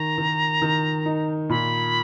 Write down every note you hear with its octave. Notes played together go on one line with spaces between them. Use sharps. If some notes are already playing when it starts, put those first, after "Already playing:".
Already playing: D#3 A#5
D#3
D#3
D#4
A#2 B5